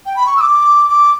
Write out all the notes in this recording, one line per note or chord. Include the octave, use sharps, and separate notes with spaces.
G5
B5
C#6
E6
D6
D6